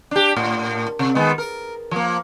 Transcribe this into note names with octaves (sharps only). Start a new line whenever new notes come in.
D4 G4
A2
C3
D#3 G#3 B3
A#4
F3 A#3